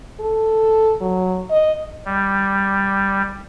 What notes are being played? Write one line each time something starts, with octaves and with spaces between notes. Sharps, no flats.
A4
F#3
D#5
G3